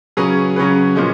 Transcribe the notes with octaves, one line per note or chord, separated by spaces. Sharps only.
C#3 F#3 C#4 G#4 B4
C#3 F#3 C#4 G#4 B4
A#2 F3 G#3 C#4